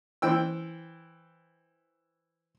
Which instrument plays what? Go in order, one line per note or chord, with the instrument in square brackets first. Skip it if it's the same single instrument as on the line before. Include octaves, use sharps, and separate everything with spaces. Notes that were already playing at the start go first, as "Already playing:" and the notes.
[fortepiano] E3 C5 G5 E6